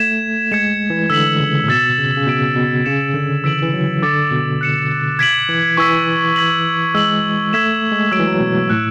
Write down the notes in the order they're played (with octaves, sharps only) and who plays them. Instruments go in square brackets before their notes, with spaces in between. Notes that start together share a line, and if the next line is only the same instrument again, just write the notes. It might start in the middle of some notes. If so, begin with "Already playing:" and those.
Already playing: [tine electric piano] A3 [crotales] G#6 B6 E7
[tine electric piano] G#3 [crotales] G#6 C#7 E7
[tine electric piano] E3
[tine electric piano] D3 [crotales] E6 B6 F#7
[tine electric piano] C#3
A2
[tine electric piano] B2 [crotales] E6 A6 E7
[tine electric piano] C#3
C#3
[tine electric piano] B2 [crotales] G#6 B6 D7
[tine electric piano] B2
[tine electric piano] C#3 [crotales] G#6 C#7 E7
[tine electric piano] D3
[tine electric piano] E3 [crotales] E6 B6 D7 F#7
[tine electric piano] E3
F#3
[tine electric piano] D3 [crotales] D6 A6 C#7
[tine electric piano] B2
[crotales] F#6 C#7 E7
G#6 B6 D7 F#7
[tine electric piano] E3
[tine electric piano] E3 [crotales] C#6 E6 B6
[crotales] G#6 B6 F#7
[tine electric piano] G#3 [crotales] E6 B6 F#7
[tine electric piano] A3 [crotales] E6 G#6 B6 E7
[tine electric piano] G#3
[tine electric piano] F#3 [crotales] E6 B6 D7
[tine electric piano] E3
F#3
B2
[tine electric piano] A2 [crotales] F#6 C#7 E7